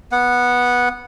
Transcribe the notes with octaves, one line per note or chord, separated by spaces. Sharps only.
B3 F#5